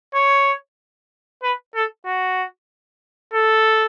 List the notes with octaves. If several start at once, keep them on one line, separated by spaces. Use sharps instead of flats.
C#5
B4
A4
F#4
A4